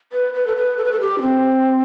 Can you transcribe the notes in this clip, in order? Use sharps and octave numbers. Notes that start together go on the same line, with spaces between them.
B4
B4
A4
B4
A4
B4
A4
G4
D4
C4